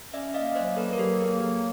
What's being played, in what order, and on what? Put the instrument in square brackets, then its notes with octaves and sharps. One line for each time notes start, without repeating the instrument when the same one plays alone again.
[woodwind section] C#4 [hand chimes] D5 E5
[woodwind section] A#3 [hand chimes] D#5 F5
[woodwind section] F#3 [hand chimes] C5 D5
[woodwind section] A#3 [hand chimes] A4 B4
[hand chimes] A#4
[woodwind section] F#3 [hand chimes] G4 A4
[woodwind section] A#3 [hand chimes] G#4
[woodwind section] F#3 [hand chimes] G4